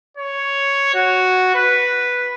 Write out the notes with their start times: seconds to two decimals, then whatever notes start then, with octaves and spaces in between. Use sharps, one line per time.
0.17 C#5
0.95 F#4
1.55 B4